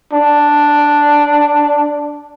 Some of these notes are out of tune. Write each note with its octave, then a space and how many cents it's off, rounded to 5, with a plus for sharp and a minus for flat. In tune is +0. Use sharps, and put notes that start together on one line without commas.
D4 +0